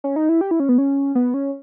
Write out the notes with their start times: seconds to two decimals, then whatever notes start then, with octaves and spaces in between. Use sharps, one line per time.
0.04 C#4
0.16 D#4
0.29 E4
0.41 G4
0.51 E4
0.60 C#4
0.69 B3
0.78 C#4
1.15 B3
1.34 C#4